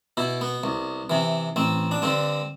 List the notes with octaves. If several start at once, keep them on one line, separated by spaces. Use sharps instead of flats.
B2 E4
B3
C2
C3 E3
A1 C4
D4
G2 D3 C4